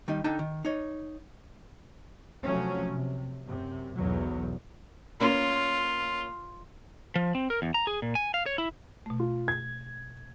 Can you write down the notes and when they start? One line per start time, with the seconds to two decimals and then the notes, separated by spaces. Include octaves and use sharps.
0.08 D#3 G3 D#4
0.24 D3 D#4 G5 A5
0.39 D#3
0.65 D#4 C#5
2.43 C3 F3 F#3 A3 C#4
2.90 C3
3.45 F#2 C3
3.96 B1 E2 G#2 F#3
5.20 A#3 C#4 F4 C#5
7.16 F3
7.35 C4
7.50 A#4
7.62 E2
7.74 A#5
7.87 G#4
8.02 A#2
8.15 G#5
8.34 F5
8.46 C#5
8.58 E4
9.06 B2 A3
9.20 F4
9.48 G#6